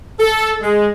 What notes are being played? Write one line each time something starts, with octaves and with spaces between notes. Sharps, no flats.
A4
G#3